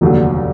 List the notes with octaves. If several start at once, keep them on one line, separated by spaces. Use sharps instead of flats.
F1 D#2 D3 F#3